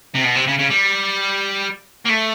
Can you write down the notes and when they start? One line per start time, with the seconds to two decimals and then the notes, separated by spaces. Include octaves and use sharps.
0.15 C3
0.24 B2
0.35 C3
0.47 C#3
0.59 C#3
0.70 G3
2.06 A#3
2.10 A3